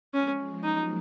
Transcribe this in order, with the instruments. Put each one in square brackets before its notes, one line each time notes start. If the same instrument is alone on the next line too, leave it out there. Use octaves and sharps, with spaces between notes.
[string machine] F3 G#3 [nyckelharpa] C#4
[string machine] F#3 A#3 [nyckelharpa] D#4